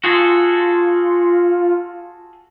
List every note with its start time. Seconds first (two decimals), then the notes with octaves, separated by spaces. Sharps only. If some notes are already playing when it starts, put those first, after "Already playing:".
0.04 F4 F#4 G#4 A4